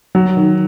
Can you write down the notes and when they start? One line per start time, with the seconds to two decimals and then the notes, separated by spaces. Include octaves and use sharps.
0.15 F#3
0.37 D#3